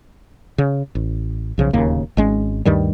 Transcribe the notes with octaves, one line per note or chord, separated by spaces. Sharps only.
C#3
A1
B1 C#3 F3
D1 D#2 C#3 A#3
G#1 G#3 C#4
D2 G2 D#3 G3